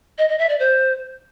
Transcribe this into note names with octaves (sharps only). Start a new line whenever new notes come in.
D#5
D#5
E5
D5
C5